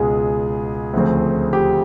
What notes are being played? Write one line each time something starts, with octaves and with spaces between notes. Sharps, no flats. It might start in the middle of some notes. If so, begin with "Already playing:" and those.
Already playing: C#2 B2 G#3 G#4
D2 C#3 F3 A3 C4
G4